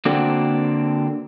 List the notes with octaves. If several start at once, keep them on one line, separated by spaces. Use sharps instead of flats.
D3 A#3 C4 D4 F#4 A4